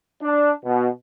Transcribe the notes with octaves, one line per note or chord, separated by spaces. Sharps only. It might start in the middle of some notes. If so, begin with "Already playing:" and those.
D4
B2